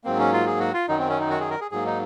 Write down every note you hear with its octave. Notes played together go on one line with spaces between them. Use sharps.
G#2 F#3 A#3 C4
C#4
F4
G#4
F#4
F4
F#2 D#3 F#3 D#4
C4
C#4
D#4
F#4
G#4
A#4
G#4
G#2 F#3 A#3 G#4
D#4